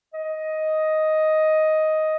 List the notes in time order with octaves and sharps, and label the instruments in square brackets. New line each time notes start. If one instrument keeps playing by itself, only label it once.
[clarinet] D#5